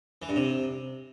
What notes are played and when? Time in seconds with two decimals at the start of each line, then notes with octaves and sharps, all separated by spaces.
0.22 E3
0.29 G2
0.36 C3